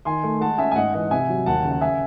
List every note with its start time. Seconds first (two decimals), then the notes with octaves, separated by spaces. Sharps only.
0.05 D#3 G#5 C6
0.23 A3
0.40 G#3 F#5 A5
0.58 C#4 E5 G#5
0.71 G#5
0.76 G#2 D#5 F#5
0.94 E3 D#5 F#5
1.11 C3 E5 G#5
1.28 F#3
1.46 D#2 F#5 A5
1.65 C#3
1.71 F#5
1.81 E5 G#5